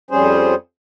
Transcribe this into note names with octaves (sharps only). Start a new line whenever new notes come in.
F2 G3 C#4 G#4 C5